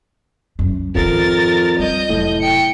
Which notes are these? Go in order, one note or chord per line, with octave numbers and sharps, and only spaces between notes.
F#2
F2 G#2 D#3 A#4 A6
G3 D#5 G6
F1 A2 F#3
G5 C#7